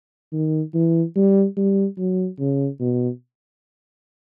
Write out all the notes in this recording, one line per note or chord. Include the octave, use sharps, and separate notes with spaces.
D#3
E3
G3
G3
F#3
C#3
B2